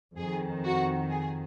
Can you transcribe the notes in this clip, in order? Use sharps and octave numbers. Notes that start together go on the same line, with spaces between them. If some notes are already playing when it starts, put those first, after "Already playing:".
F2 D#3 G#4
F#4
G#4